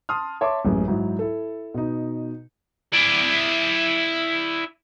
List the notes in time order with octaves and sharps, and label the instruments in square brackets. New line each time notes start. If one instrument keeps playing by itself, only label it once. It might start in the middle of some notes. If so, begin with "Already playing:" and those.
[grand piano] A5 C6 D#6 F6
C#5 E5 A5 C6 D6
A1 F#2 G#3
G#2 F#3 D#4 E4
E4 A4
B2 D#4
[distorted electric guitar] E4 D5